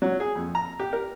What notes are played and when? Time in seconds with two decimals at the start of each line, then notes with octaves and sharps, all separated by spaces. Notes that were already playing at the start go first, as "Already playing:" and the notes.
0.02 F#3
0.20 G#4
0.36 F2
0.55 A#5
0.80 G4
0.93 A#4